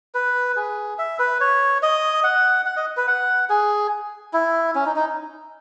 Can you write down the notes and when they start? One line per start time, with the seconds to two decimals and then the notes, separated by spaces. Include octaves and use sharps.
0.14 B4
0.56 G#4
0.98 E5
1.19 B4
1.40 C#5
1.82 D#5
2.24 F#5
2.66 F#5
2.76 D#5
2.97 B4
3.07 F#5
3.49 G#4
4.33 E4
4.75 C#4
4.86 D#4
4.96 D#4